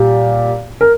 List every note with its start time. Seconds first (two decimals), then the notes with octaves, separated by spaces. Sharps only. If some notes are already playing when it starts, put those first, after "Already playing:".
Already playing: A#2 G3 G4
0.81 A#4